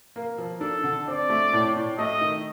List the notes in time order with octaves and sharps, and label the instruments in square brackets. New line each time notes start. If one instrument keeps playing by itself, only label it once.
[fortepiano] A#3
F3
[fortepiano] D4 [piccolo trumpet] A4
[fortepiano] D3
[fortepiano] C4 [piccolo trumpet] D5
[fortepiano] A3
A2
A2
[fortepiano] A3 [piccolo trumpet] D#5
[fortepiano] D#3